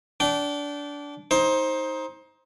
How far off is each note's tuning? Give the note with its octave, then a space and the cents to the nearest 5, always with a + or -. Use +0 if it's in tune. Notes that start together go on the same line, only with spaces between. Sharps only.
D4 -20 G5 -30
D#4 +20 C5 +15